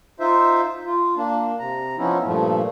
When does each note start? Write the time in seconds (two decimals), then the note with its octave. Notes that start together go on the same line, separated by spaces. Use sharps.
0.20 D#4 F4 C5 E5
0.86 F4
1.17 A#3 D4
1.59 C3 A#5
1.98 F3 B3 C#4 D#4 E4
2.24 G2 A#2 F3 A3